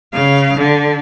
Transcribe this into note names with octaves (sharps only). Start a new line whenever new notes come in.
C#3 F5
D3